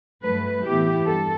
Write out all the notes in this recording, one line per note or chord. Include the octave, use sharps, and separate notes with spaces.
G2 F#3 A3 B4
A2 E3 B3 E4 G4
G2 A4